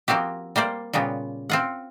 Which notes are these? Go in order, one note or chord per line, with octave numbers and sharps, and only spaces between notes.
F3 A#3 C4 F#4 G4
G3 A#3 C5 D5
A#2 C#3 G3 B3
C4 F4 F#5